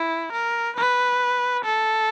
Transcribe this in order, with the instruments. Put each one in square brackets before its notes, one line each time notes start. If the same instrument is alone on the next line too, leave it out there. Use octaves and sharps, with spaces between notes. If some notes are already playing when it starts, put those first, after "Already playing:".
Already playing: [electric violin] E4
A#4
B4
A4